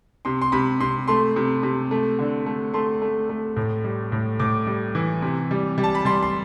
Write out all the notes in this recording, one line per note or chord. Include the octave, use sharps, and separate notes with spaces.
C3 C6
C6
C3 B5
C3 C6
A3 C6
C3
C3
A3
D3
A3
A3 C6
A3
A3
A2
G3
A2
A2 D6
G3
E3
C3
G3
G3
A5
B5
G3 C6
C6